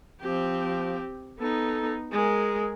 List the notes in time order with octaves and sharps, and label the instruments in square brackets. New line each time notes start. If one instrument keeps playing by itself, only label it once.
[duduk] F3 [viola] C4 G4
[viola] B3 D#4 [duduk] A4
[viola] G#3 A#4 [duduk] G#4